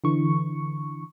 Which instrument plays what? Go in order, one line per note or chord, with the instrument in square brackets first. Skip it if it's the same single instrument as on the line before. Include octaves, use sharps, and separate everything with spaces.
[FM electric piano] D3 E3 C#6